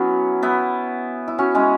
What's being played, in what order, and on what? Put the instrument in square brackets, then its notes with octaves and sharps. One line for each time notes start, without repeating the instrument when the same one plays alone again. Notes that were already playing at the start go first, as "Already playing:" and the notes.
Already playing: [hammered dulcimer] F#3 B3 C#4 E4
B3 E4
E4
C#4 F#4
G#3 C#4